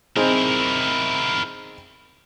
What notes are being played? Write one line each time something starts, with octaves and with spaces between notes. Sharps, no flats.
C4 D#4 E4 G#4 A#4